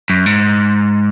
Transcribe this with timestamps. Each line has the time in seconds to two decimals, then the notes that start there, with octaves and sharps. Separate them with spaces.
0.10 F#2
0.26 G#2